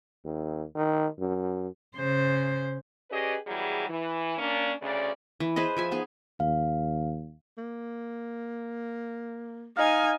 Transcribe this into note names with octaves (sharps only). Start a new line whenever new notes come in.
D#2
D#3
F#2
C#3 C5
C#4 G4 G#4 B4 D5 D#5
B2 E3 F#3 G3 G#4
E3
A#3 C#4 D4
D2 C#3 D5
E3
G#4 B4 C5 D#5
F3 E5 G#5
B3 D#4 G#4
D#2 F5
A#3
D#4 D#5 F5 G#5 F6